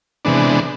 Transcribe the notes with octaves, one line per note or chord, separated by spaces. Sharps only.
C3 E3 G#3 B3 D4